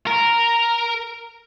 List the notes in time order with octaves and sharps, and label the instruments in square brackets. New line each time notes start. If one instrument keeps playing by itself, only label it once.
[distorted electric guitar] A#4